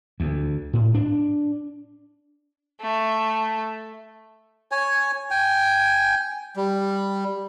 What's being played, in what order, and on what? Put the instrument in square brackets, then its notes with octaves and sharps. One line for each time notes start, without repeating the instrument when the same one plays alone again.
[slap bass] D2
A2
D4
[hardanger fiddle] A3
[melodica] C#5 G#5
G5 G#5
G3